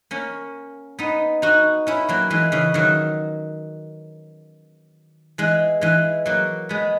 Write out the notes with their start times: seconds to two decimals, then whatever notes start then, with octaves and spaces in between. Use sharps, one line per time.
0.11 A#3 C#4
0.99 B3 D#4
1.42 D#4 F#4
1.87 C#4 E4
2.09 F#3 A#3
2.30 E3 G#3
2.52 C#3 E3
2.74 D#3 F#3
5.38 E3 G#3
5.81 E3 G#3
6.26 F#3 A#3
6.69 G#3 B3